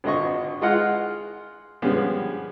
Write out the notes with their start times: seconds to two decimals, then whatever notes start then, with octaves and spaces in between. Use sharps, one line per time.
0.04 G#1 D3 D#5 C#6
0.61 G#3 F4 D#5 F#5 F6
1.82 D3 F3 G3 G#3 B3 C#4